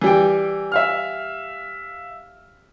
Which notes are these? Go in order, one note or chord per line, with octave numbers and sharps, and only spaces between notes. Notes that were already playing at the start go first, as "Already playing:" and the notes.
E3 G3 G5
E5 F5 F6